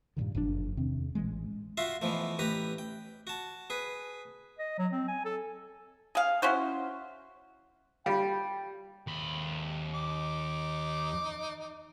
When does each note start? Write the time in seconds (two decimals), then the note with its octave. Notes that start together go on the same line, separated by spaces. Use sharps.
0.16 G2 A#2 D3 D#3
0.35 F#1 F2 A2 D4
0.77 E2 C3 D#3 C4
1.15 A1 A#2 E3 G#3
1.77 F4 F#4 E5 C6
2.02 B2 E3 F3 A3
2.39 A1 G4 B4 A#5
2.78 G5
3.27 F#4 A5
3.70 G#4 B4
4.59 D#5
4.78 F#3
4.92 C4
5.08 G#5
5.25 A4
6.15 G#4 F5
6.42 C#4 E4 F#4 C5
8.06 G3 F4 F5 G5
9.07 D#2 B5
9.94 D#4 D6